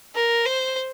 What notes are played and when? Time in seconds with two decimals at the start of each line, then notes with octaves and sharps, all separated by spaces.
0.15 A#4
0.46 C5